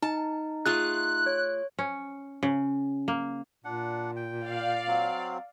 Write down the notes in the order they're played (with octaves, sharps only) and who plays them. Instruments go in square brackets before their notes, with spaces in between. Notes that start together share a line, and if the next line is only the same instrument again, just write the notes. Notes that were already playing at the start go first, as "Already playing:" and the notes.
[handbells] D#4 [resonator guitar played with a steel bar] A5
[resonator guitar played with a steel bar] A3 F4 G#4 [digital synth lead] F#6
[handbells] C#5
[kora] C#4
C#3
A#3
[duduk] A#2 [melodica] D4 F#5
[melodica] G5
[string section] D5 F5
[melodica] F#3 C4